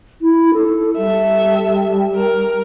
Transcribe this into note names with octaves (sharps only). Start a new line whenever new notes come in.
E4
A4
G3 A4 E5
A#4